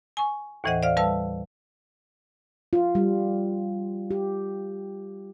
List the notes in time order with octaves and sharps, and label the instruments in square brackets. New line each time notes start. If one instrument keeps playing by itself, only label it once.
[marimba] G#5 C#6
D#2 A2 E3 C5 D#5 F#5
C5 D5 E5 F5 F6
G3 B4 F5 A5 E6
[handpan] F4
G3
G4